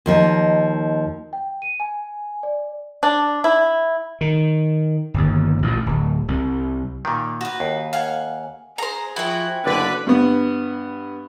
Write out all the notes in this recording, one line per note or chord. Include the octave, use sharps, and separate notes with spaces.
D#2 F3 D#4
G5
D#7
G#5
D5
D4
E4
D#3
G1 D#2
A1 A#2
D1
C2
A#2 D#3
F#4 B4
D#2
F5 F#5 G#5
G#4 C5 A#5
F3 E4 F#4 G5
F#1 B2 D3 B4 D5
G2 B3